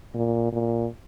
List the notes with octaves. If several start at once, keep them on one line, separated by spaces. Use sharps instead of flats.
A#2
A#2